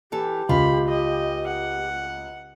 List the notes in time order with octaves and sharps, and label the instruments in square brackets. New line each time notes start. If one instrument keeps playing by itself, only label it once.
[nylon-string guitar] E3 A4 [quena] G4
[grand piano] C#2 [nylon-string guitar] F4 [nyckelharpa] B5
[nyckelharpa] D#5
F#5